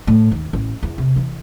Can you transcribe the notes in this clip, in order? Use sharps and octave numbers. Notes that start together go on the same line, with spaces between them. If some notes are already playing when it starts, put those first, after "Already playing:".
A2
D#2
A1
E2
C3
E3